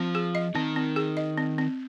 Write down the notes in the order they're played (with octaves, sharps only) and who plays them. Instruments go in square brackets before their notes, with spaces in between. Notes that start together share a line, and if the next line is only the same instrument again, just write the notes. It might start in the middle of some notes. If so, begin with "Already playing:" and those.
Already playing: [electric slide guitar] F3 F4 [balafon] C4
[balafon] G#4
D#5
[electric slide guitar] D#3 D#4 [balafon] C4
[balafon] C4
G#4
D#5
C4
C4